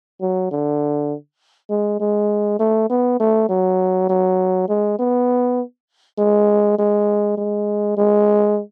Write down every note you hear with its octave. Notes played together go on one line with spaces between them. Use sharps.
F#3
D3
G#3
G#3
A3
B3
A3
F#3
F#3
G#3
B3
G#3
G#3
G#3
G#3